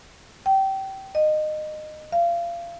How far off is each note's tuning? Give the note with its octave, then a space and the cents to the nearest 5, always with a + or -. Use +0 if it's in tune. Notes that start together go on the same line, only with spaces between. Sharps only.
G5 -25
D#5 -20
F5 -30